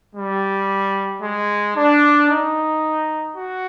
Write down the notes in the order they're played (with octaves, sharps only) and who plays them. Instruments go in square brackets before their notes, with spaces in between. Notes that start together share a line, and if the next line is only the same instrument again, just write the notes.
[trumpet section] G3
G#3
D4
D#4
F#4